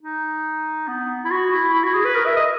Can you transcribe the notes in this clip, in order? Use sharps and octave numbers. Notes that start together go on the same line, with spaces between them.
D#4
B3
E4
F#4
E4
E4
F#4
G#4
B4
A#4
E5
D#5